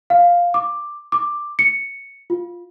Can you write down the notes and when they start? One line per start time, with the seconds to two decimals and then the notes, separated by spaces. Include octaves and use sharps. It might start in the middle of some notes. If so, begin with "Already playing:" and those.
0.10 F5
0.54 D6
1.12 D6
1.59 C#7
2.30 F4